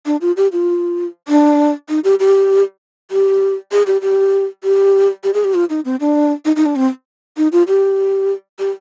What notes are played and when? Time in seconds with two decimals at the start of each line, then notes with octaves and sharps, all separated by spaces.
0.06 D4
0.21 F4
0.37 G4
0.52 F4
1.28 D4
1.89 D#4
2.04 G4
2.20 G4
3.11 G4
3.72 G#4
3.87 G4
4.02 G4
4.64 G4
5.24 G4
5.34 G#4
5.44 G4
5.54 F4
5.70 D#4
5.85 C4
6.00 D4
6.45 D#4
6.56 D#4
6.66 D4
6.76 C4
7.37 D#4
7.52 F4
7.68 G4
8.59 G4